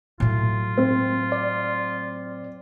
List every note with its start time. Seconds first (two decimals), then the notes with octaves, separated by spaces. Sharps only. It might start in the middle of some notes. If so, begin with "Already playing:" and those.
0.20 A2 F#3 F4
0.78 C4
1.32 D5